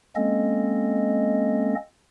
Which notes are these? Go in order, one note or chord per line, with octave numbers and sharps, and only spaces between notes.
G#3 A#3 C4 C#4 A4 D#5